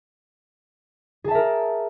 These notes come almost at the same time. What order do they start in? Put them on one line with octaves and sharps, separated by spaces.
G#4 A5 E5 A#4